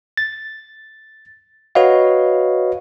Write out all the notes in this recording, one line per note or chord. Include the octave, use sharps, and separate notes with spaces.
A6
F#4 B4 C#5 D#5 F5